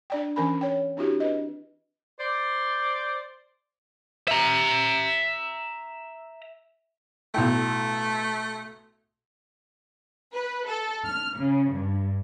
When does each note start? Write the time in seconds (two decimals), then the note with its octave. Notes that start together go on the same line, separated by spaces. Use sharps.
0.10 D4 D5 G5
0.36 E3 C#4 A#4 G#5 B5
0.61 C#5 G5
0.97 C4 D4 E4 F#4 G4
1.20 D4 B4 D#5
2.19 C5 D5
4.28 E5 A#5
7.35 B1 A2 A3 G5
10.33 B4
10.66 A4
11.04 F6
11.38 C#3
11.72 G2